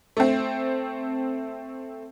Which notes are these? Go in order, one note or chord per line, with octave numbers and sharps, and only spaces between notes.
A3 C4